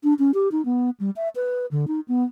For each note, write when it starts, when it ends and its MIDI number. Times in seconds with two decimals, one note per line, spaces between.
0.04 0.14 62
0.19 0.32 61
0.34 0.48 67
0.52 0.64 63
0.65 0.90 59
1.00 1.10 55
1.16 1.28 76
1.36 1.66 71
1.71 1.86 50
1.88 2.00 63
2.08 2.24 59